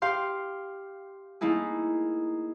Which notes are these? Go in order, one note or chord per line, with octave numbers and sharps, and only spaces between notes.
G4 F5 C6
A3 A#3 D#4 E4 G#4